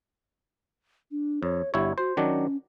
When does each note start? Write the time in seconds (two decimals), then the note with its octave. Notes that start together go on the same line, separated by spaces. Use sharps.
1.11 D4
1.43 F2 C#5
1.74 G1 E4 G4 C#5
1.98 F#4 C5
2.17 D#3 F#3 C#4 D4